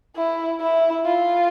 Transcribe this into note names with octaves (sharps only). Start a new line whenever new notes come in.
E4
E4
F4